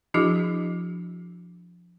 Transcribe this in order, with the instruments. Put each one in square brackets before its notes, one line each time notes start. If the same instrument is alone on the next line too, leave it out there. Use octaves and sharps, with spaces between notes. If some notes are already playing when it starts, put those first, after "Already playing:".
[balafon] F3 D4 E4 F#4 G#4 D6